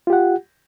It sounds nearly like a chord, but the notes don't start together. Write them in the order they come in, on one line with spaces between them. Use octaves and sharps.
F4 G4 F#5